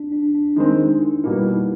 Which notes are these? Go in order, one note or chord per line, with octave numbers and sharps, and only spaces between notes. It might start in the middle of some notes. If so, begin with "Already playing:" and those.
Already playing: D4
D4
D4
D#3 G#3 C4 D#4
E4
B2 G3 A#3 E4
D#4